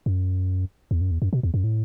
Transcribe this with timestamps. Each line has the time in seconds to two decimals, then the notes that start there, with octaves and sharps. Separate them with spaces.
0.06 F#2
0.91 E2
1.01 F#2
1.11 E2
1.22 F#2
1.33 B2
1.43 E2
1.54 F#2
1.64 A2